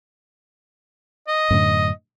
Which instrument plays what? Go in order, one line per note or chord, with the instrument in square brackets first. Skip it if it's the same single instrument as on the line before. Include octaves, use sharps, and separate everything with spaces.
[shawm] D#5
[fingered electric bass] F#2 A2 D3